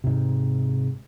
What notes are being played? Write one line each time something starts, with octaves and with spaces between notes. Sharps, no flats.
G#2 C3